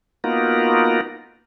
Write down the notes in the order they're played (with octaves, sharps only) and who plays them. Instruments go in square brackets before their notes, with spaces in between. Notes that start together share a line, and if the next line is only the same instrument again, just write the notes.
[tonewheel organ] A#3 B3 D#4 F4 F#4 A#4